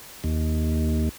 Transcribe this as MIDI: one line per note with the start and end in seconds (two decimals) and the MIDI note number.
0.24 1.09 39